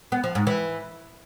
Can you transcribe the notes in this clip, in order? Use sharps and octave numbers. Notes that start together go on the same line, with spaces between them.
B3
F3
G#2
E3